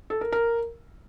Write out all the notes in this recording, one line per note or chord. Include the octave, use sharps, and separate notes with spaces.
A4
A#4
A#4